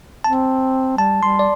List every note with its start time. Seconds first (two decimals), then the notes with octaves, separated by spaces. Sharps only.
0.24 C4 A5
0.98 G3 A5
1.22 G3 C6
1.39 D5